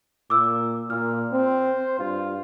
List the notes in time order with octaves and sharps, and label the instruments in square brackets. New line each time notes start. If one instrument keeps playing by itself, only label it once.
[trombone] A#2 [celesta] D6 E6
[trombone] A#2 [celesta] F6
[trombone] C4 [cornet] C5
[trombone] G2 [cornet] F4